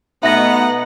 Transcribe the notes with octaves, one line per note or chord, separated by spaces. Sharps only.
B2 A3 B3 D#4 E5 F#5 A#6